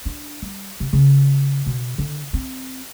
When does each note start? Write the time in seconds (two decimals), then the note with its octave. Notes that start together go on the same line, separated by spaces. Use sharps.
0.05 D4
0.42 G3
0.80 C3
0.93 C#3
1.66 B2
1.98 D3
2.33 C4